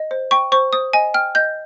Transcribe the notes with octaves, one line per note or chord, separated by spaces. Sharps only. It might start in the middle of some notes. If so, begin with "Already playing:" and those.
Already playing: D#5
C5
G5 C#6
C5 C#6
C5 D#6
D#5 G#5
G5 F6
D#5 G6